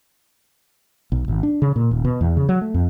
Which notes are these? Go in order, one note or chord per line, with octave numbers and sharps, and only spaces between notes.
B1
G#1
D4
C#3
A#2
D#1
B2
E2
C#3
F#3
A3
F2